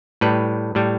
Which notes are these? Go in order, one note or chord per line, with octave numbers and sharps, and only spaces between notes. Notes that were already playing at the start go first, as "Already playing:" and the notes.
A2 G3 B4
A2 G3